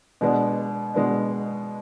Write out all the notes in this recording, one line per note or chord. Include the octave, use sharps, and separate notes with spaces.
B2 G#3 B3 D4
B2 G#3 B3 D4